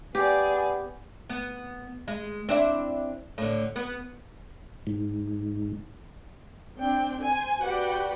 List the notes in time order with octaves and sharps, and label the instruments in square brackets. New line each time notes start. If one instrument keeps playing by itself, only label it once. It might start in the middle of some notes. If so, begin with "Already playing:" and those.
[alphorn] B3 [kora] G4 [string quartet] G#4 D5
[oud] B3
G#3
C4 D4 E4
A2 D3
B3
[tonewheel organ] G#2
[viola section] C4 D4 G5
C5 G#5
F#4 G4 B4 D5 F#5 G5